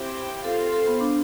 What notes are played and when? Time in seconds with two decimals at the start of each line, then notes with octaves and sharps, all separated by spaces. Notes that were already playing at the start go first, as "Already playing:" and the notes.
Already playing: C4 E4 G4 C5 G5
0.44 C4 F4 A4 C5 F5
0.72 A4
0.87 B3
1.01 D4